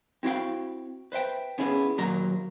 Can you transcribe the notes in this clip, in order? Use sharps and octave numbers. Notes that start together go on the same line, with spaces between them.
C4 E4 F#4 F5 G5
B4 C5 E5 G5
B3 C#4 E4 G#4
D#2 A#2 F#3 A#3 A#5